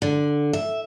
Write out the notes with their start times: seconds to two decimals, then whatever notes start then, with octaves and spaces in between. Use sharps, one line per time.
0.02 D3
0.53 E5